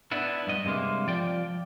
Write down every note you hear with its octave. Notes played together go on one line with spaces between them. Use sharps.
B3 D4 E4
G2 D#5
G2 C3 G#3 A#3
F3 D5 G5